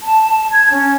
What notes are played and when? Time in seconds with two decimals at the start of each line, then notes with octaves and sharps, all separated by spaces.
0.01 A5
0.51 G#6
0.72 C#4